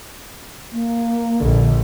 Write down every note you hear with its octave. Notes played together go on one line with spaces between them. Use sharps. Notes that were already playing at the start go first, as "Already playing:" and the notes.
A#3
A#1 D3